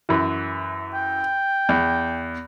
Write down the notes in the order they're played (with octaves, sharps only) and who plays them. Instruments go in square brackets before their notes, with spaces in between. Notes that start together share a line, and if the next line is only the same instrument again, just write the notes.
[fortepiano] F#2 E3
[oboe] G5
[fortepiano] E2